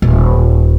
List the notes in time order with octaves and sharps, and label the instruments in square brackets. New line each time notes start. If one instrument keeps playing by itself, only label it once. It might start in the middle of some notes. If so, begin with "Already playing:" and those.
[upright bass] D#1